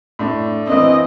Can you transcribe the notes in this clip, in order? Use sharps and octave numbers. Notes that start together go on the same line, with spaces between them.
A2 D4
E3 A#3 C4 D#5